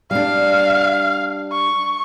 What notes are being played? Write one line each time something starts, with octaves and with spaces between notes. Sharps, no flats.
G3 D4 F5
C#6